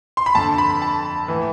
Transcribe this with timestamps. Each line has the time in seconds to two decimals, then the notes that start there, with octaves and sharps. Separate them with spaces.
0.17 C6
0.26 B5
0.35 F2 D3 A5
0.58 B5
0.82 A5
1.28 A2 E3